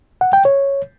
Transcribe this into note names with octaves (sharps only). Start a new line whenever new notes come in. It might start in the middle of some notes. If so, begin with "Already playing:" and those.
F#5
G5
C#5